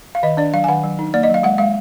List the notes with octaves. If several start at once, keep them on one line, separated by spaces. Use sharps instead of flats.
F5
D#3 D#5
D4 D5
F#3 F5
G#5
D#3 F#5
F#3
D#4
A#3 D5
D#5
F#3 F5
G#3 F#5
G#3 F5